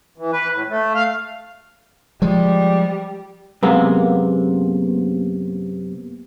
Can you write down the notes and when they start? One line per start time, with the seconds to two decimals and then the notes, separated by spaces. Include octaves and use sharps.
0.18 E3
0.33 B4
0.52 A2
0.69 A3
0.95 F5
2.22 F3 G3 G#3
3.63 F#2 C3 G#3 A#3 B3